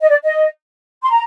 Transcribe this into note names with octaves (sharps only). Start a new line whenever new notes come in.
D#5
D5
D#5
C6
A#5